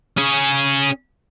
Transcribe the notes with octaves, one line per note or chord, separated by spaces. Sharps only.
C#4 G#4